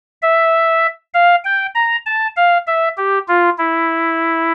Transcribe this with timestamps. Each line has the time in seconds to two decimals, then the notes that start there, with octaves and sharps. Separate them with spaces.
0.22 E5
1.14 F5
1.45 G5
1.75 A#5
2.06 A5
2.36 F5
2.67 E5
2.97 G4
3.28 F4
3.58 E4